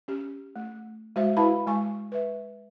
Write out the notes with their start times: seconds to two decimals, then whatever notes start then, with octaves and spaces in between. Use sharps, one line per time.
0.08 C#4 G4
0.56 A3
1.16 G#3 F#4 C5 E5
1.37 E4 F#4 B4 F5 A5 B5
1.67 G#3 G#5 C#6
2.12 B4 E5